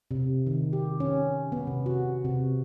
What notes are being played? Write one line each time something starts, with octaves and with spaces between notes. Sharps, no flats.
C3
D#3
G4
C#4
B3
C3
F#4
C3